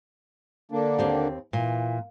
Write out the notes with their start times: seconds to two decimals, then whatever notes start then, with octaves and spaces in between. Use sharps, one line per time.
0.72 D3 A#3 D4
0.99 D#2 C4 G4
1.53 A#2 E3